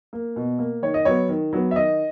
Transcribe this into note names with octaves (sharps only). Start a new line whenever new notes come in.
A#3
B2
A#3
D#3 C#5
D#5
F#3 B3 C#5
D#3
F#3 B3
E5
D#3 D#5